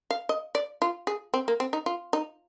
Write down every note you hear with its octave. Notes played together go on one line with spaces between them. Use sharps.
F5
D#5
D5
F4
G#4
C4
A#3
C4
D#4
F4
D#4